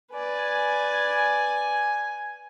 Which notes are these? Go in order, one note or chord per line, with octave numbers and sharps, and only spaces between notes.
B4 D5 G#5